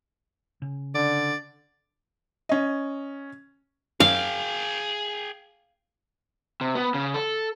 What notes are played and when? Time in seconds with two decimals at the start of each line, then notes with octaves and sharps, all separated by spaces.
0.62 C#3
0.95 D3 D5
2.49 C#4 D#5
4.00 F#2 G#4 F5 G5
6.61 C3
6.75 B3
6.94 C#3
7.14 A4